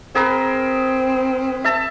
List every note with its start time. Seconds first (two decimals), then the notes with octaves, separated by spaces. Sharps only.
0.15 C4 G#4 A#4 B4
1.64 E5 A5